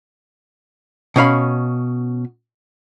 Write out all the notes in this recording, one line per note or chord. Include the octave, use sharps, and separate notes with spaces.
B2 C#4 F5 B5